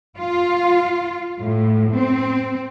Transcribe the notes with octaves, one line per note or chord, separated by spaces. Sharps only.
F4
A2
C4